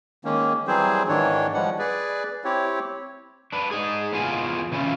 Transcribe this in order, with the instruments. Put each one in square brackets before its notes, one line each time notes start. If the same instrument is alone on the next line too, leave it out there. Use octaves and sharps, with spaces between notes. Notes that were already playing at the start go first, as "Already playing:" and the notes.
[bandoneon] D#3 G#3 A#3 C#4
E3 F#3 G3 C4 G#4 C5
G#2 D#3 E3 D4 C#5
F3 G3 G#3 F#5
G#4 B4 D5
C4 E4 G4 C#5
[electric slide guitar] D4 B4
D#4 G#4
E2 B3 F4 G#4 F5 G#5
C#3 E3 C#4 E4 F4